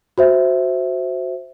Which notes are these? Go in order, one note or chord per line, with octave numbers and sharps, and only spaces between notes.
F#4 C5 E5